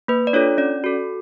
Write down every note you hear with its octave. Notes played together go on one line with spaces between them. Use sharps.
A#3 B4
D5
D4 F4 A4 C#5
C#4 D5
F#4 A4